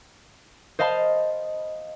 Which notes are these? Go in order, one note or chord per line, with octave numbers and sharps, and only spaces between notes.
C5 D#5 F5 A5 B5